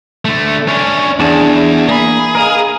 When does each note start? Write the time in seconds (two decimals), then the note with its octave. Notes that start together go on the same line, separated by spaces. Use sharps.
0.25 D3 A3
0.68 C#4 D4
1.20 E2 D4 G#4 A5
1.89 A#3 G#4 B5
2.35 A#4 D#5 F5